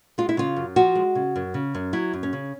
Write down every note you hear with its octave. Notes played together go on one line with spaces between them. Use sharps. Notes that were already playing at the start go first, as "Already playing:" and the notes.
G#3 F4
E4
C#3 F4
F#2
F3 F#4
G#3
C#3
F#2
C#3
F#2
F#3 E4
F#2
C#4
C#3